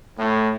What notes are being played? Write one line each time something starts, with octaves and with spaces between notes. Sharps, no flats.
A2